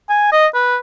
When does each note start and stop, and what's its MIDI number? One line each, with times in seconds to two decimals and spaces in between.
0.10 0.28 80
0.32 0.47 75
0.54 0.77 71